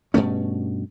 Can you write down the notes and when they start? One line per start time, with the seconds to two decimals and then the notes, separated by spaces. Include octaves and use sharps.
0.14 G2 B2 A3 C#4